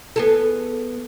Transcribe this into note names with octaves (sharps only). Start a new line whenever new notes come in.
B3 G#4 A4